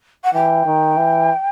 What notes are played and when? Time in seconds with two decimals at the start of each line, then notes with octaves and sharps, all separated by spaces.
0.24 F#5
0.34 E3 G5
0.66 D#3
0.97 E3